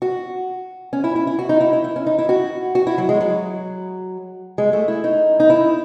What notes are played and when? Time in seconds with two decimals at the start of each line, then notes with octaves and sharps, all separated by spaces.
0.02 F#4
0.93 C#4
1.04 E4
1.16 E4
1.27 E4
1.39 F#4
1.49 D#4
1.61 E4
1.73 E4
1.84 E4
1.96 C#4
2.07 D#4
2.18 E4
2.29 F#4
2.75 F#4
2.87 E4
2.98 F#3
3.09 G#3
3.21 F#3
4.58 G#3
4.73 A3
4.88 E4
5.04 D#4
5.40 D#4
5.50 E4